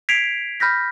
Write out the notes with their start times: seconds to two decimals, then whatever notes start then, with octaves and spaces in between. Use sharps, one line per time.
0.09 G#6 B6 C7 D7 F7
0.60 B5 F6 G6 A#6 B6